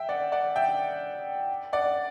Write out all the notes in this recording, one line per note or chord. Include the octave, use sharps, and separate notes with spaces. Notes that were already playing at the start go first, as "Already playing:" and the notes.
Already playing: E5 G5
D5 F#5
D5 F#5
E5 G5
D5 F#5